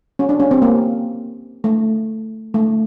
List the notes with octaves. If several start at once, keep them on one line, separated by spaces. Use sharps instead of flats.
C#4
D4
C#4
C4
A#3
A3
A3